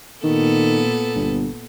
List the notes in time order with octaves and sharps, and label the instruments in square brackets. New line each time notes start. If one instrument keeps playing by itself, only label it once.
[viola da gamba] A#2 B3 A4 [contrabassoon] D#3
[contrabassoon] G1